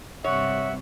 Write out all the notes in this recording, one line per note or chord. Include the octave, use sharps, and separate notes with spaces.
G2 C3 C#5 E5 F#5